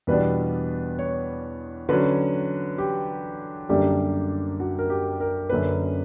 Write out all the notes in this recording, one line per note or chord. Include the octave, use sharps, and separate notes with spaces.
E2 B2 G3 B3 D4 B4
C#5
D3 F#3 C#4 B4
G4
F#2 D3 G3 A#3 D4 G4
F#4
A#4
G4
A#4
F#2 D3 A#3 C#4 B4